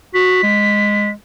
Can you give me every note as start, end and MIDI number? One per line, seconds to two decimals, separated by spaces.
0.14 0.40 66
0.14 1.10 95
0.43 1.12 56